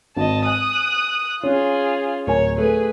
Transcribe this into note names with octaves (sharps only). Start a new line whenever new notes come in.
G#1 D#5 A5
G#5 D#6 F#6
C#4 F4 G#4
D1 A#4 C#5 G#5
A3 G#4 B4